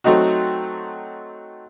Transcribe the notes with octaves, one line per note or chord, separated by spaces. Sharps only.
F#3 A3 C4 D#4 F#4